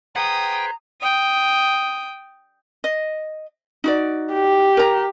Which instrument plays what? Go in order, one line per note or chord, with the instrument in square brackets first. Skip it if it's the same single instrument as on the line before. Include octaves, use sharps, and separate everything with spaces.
[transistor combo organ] G#4 B4 C5 [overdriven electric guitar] F#5 G5 [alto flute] A#5 [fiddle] D#6
[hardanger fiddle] G5 D#6
[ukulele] D#5
D#4 F#4 D5
[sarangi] G4
[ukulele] A#4 A#5